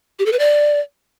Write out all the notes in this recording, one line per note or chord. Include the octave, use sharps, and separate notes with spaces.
G4
A4
B4
D5